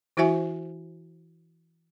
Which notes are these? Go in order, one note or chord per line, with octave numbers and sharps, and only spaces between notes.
E3 E4 F#4 C5 E5 G#5